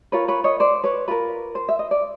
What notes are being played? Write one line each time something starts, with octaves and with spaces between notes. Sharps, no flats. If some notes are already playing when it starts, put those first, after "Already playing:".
F4 A#4 B4 C#5
B4 C#5
C#5 D#5
C5 D5
B4 C#5
F4 A#4 B4
C5
E5
D#5
D5